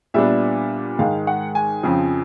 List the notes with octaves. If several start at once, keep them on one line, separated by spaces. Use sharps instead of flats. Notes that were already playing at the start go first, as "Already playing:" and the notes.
A#2 G3 B3 D4 E5
G#2 D#3 G#3 F5
F#5
G#5
F2 C#3 F3